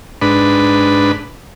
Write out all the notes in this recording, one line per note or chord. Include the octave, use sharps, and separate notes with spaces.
G#2 D4 B4